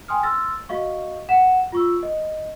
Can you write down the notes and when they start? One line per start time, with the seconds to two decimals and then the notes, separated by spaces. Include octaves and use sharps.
0.08 G5 G#5 C6 D#6 F6
0.23 C6 E6 F6 A6 A#6
0.69 F#4 D#5 F5 C#6
1.29 F#5 E7
1.72 F4 C#6 E6
2.03 D#5